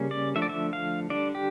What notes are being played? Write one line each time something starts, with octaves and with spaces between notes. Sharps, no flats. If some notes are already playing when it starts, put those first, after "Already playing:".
Already playing: C#3 G3 A#3 C#4
D5
D3 F3 A3 D4 E5
D5
E5
F5
D3 G3 D4 D5
G4